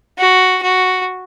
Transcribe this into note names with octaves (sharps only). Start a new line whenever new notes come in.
F#4
F#4